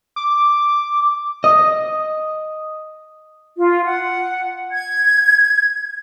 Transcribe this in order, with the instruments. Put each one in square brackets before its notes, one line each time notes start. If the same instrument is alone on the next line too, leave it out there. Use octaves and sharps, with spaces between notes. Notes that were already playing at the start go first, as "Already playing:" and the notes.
[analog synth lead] D6
[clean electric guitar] D#5
[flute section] F4
F#5
G#6